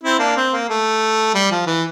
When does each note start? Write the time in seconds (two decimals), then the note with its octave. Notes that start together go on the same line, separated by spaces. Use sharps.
0.03 C4 E4
0.19 A#3 D4
0.36 C4
0.52 A#3
0.69 A3
1.34 G3
1.51 F3
1.66 E3